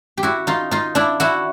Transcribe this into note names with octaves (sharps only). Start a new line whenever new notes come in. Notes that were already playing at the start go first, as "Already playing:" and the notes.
G4
E4 F#4
D#4 F4
D#4 F4
D4 E4
E4 F#4